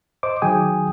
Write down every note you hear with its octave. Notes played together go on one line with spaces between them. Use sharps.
C5 D#5 D6
D#3 F#3 G#4 G5 G#5 D#6